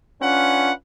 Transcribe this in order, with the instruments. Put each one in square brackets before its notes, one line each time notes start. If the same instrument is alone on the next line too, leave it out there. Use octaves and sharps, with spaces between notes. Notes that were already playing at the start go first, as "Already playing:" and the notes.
[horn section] C#4 D4 F4 B4 F#5